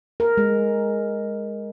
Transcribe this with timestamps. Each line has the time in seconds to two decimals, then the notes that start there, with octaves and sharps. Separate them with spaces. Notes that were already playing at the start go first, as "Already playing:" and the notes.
0.20 A#4
0.37 G#3